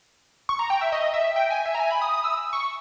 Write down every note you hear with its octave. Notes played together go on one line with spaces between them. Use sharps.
C#6
A#5
G5
E5
D#5
E5
G5
G#5
E5
A#5
G#5
B5
D#6
D#6
E6
C#6